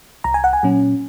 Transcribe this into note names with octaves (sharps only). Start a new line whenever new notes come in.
C2 A#5
G#5
F#5
G#5
A#2 F#3 C#4